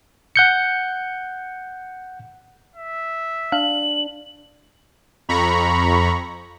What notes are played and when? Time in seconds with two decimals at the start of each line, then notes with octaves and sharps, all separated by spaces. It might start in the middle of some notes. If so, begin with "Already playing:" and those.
0.36 F#5 G6 C#7
2.76 E5
3.52 D4 F5 F#7
5.29 F2 A#5 B5 C#6